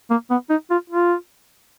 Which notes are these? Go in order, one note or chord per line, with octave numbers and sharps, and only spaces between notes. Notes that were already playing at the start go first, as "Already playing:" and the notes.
A#3
B3
D#4
F4
F4